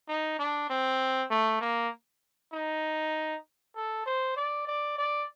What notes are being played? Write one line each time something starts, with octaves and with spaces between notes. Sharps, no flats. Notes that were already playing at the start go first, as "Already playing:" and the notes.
D#4
D4
C4
A3
A#3
D#4
A4
C5
D5
D5
D5